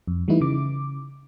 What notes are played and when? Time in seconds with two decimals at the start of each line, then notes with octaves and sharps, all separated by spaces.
0.07 F2
0.28 E3 G3 A3 D#4 E4 B4
0.41 C#3 D6